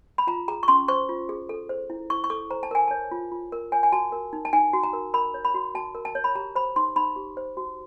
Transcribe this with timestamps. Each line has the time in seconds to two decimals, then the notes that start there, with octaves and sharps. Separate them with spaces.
0.18 B5
0.27 F4 A#5
0.48 G#4 A#5
0.63 C#6
0.68 C#4 C6
0.88 C5 C#6
1.09 F4
1.29 G#4
1.49 A4
1.69 C5
1.90 E4
2.10 E4 C#6
2.24 C#6
2.30 A4 D6
2.51 C5 A#5
2.63 A5
2.71 A#4 G#5
2.88 C#5 A5
3.11 F4
3.32 F4
3.52 A#4
3.72 C#5 G#5
3.83 G#5
3.92 F#4 A5
4.12 A#4
4.33 D#4
4.45 A5
4.53 D#4 G#5
4.73 F#4
4.83 A#5
4.93 A#4
5.14 A#4 B5
5.34 C#5
5.45 B5
5.54 F#4
5.75 F#4 A5
5.95 A#4
6.05 A5
6.15 C#5
6.24 B5
6.35 G4 A#5
6.55 C5 B5
6.76 D#4 C6
6.96 D#4 B5
7.16 G4
7.37 C5
7.57 F#4